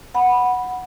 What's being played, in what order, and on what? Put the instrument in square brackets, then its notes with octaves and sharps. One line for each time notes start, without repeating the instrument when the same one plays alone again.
[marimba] F#5 B5